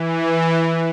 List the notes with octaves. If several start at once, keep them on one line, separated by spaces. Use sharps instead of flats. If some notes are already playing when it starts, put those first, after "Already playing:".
Already playing: E3